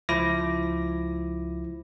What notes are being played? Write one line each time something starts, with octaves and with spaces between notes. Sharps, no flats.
C#2 F3 E4 D6 A#6